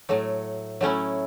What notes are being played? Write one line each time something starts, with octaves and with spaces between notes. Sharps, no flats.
A2 F#3 A3
F#3 A3 C#4 E4